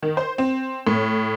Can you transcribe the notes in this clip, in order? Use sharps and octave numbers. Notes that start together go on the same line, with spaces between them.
D#3
C5
C4
A2